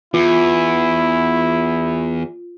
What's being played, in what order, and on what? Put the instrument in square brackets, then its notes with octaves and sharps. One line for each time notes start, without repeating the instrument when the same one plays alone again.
[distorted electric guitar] E2 [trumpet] E4 [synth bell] F4